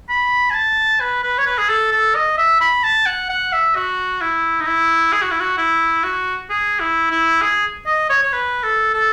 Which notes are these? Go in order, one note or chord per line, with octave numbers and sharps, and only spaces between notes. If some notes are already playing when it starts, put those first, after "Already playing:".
B5
G#5
A5
B4
B4
C#5
B4
G#4
A4
A4
D#5
E5
B5
A5
F#5
F#5
E5
F#4
E4
D#4
E4
G#4
F#4
E4
F#4
E4
F#4
G#4
E4
E4
G#4
D#5
C#5
C#5
B4
A4
A4